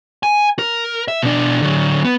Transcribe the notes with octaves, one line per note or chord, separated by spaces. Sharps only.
G#5
A#4
E5
B2 D4
D3 F#3
B3